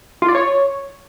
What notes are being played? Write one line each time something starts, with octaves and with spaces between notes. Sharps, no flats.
F4
D5
C#5